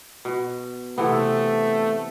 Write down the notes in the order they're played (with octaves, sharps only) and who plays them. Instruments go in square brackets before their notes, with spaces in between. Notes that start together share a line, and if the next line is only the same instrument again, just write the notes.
[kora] B2
[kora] C3 E3 B3 [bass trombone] A3